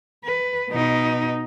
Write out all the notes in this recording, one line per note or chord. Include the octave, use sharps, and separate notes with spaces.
B4
B2 D#4